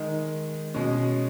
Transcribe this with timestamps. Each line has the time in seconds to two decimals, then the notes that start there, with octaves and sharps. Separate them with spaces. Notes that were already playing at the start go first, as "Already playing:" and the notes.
Already playing: D#3 G#3 D#4
0.74 B2 G#3 C#4